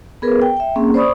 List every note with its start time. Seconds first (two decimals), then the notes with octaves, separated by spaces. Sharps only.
0.22 B3 G#4 A#4 B4
0.42 G5
0.57 E5 G5
0.76 A#3 C4 C#4 G#4
0.94 C5 D5 B5 C#6 D#6